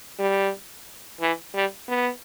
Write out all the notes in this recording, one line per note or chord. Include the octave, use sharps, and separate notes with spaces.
G3
E3
G3
B3